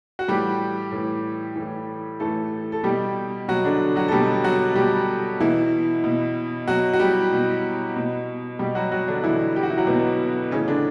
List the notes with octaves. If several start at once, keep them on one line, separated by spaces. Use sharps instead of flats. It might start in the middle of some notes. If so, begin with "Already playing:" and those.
F#4
A2 E3 G3 G4
A2 E3
A2 E3
A2 E3 A3 A4
A4
B2 G3 G4
B2 F#3 F#4
D3 D4
F#3 F#4
A4
B2 G3 G4
F#3 F#4
B2 G3 G4
B2 E3 E4
B2
B2 F#3 F#4
F#4
G3 G4
B2
B2
B2 G3 G4
F#3 F#4
F#3 F#4
D3 D4
B2 E3 E4
G4
F#4
E4
F#3 F#4
B2 B3
A2 C#3 E3 C#4
D3 D4